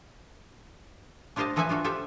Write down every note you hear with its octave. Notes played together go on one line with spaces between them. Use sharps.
D4 F4 G4 C5 D#5 A5
E3 F3 A4 B4 E5 G#5
D4 F4 F#4 A4
F4 G4 A4 C5 E5